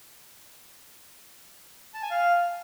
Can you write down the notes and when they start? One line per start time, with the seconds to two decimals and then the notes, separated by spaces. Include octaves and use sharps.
1.94 A5
2.02 G#5
2.11 F5